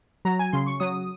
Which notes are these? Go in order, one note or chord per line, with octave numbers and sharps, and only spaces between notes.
F#3 A#5
G#5
C#3 C6
C#6
F#3 D#6